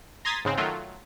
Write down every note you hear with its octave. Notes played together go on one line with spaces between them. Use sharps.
A#5 C6 D#6 G#6 A6 B6
G#2 C#3 G#3 C4
D#3 F#3 A3 F4